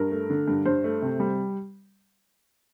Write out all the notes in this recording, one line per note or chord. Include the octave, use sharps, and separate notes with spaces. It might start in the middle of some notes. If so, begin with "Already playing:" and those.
Already playing: G2 A#4
A3
D3
G2
G2 C5
A3
C3
G3